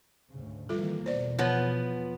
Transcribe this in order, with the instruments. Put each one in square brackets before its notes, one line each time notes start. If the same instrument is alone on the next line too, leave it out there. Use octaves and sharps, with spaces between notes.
[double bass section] D2 G#2 C#3
[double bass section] D#3 E3 A#3 [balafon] G3 F4 A4
[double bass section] E2 B2 [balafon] C5 D5
[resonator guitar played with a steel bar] F3 B3 [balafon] C#5